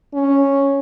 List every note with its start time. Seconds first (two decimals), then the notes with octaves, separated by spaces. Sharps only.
0.14 C#4